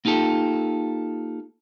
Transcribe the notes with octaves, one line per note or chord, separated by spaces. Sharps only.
A#3 D#4 F4 G4 A4